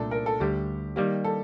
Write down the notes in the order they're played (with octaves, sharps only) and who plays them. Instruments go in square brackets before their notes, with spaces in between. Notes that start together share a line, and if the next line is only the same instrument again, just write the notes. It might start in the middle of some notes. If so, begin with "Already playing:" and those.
Already playing: [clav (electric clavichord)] C2 A#2 A3 D4 [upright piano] A4
[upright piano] A#4
A4
[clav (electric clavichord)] D2 D3 G3 [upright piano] G4
[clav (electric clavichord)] D#3 G3 A#3 [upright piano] G4
[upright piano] A4